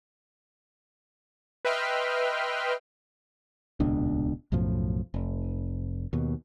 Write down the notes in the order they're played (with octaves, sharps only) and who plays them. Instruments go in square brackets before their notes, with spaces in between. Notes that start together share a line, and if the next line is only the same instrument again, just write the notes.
[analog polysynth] B4 D#5 E5 G5 C6 F6
[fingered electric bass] D#1 C#2 B2 D4
B1 F#2 A2 F3
F1
D#2 B2